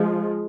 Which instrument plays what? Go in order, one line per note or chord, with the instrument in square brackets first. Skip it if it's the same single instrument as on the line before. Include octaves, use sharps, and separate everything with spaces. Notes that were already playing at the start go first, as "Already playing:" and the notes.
Already playing: [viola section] F3 G#3